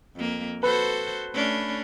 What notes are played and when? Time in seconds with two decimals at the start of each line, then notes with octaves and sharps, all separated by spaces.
0.15 F2 A#3
0.63 F#4 A4 B4 C5
1.34 A3 C#4 D4